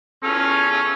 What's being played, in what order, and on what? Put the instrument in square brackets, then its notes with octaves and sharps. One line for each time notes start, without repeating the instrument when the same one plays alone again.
[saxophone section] E2 F4 A4 [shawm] C#4